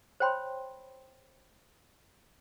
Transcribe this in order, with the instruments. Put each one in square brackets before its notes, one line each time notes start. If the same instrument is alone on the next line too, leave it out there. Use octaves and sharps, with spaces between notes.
[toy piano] C5 C#5 G5 B5 C6